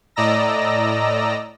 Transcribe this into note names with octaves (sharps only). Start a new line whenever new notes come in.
A2 D5 D#5 A#5 E6 A#6